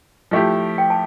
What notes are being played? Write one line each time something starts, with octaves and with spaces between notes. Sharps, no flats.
F3 A3 E4 G4
G5
A5